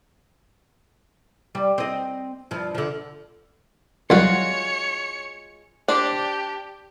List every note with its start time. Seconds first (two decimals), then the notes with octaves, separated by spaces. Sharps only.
1.55 G3
1.78 C4 D#5
2.51 G2 F3
2.75 D3 F3
4.10 C2 F#3 G#3 F4 F#4 C#5 C#7
5.88 D4 G4 C5 D5